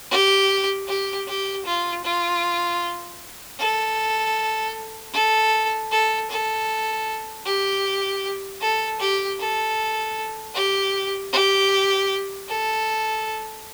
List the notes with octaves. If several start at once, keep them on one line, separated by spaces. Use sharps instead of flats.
G4
G4
G4
F4
F4
A4
A4
A4
A4
G4
A4
G4
A4
G4
G4
A4